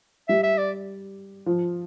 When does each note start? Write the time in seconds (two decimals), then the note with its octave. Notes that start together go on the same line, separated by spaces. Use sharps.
0.28 G3 E5
0.43 E5
0.58 D5
1.46 F3